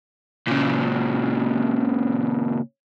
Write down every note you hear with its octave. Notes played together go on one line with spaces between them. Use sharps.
A#2 C#3